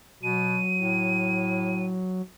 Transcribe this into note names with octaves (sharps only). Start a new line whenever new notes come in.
B2 F#3 D#7
A2